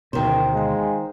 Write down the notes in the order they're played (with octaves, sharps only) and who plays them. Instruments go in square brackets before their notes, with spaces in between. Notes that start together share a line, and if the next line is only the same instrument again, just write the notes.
[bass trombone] F#1 [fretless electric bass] D2 B2 [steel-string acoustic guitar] D#3 C5 [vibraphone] A#4 G5
[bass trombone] G#3 [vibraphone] F5 G#5